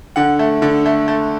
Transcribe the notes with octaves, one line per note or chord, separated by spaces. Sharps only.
D3 F#5
A3
D3
A3
A3